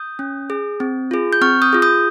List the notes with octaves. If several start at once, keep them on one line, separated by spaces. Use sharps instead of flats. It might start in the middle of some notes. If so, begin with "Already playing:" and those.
Already playing: D#6 G6
C#4
G#4
C4
F4 G#4
G6
C4 C#6 F6
D#6 G6
F4 G#4
D#6 G6